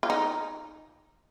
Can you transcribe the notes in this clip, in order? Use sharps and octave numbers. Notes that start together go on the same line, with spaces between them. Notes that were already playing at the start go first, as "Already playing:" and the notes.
F4
D#4